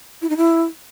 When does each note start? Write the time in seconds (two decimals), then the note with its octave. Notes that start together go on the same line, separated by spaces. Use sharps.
0.22 E4
0.29 D#4
0.37 E4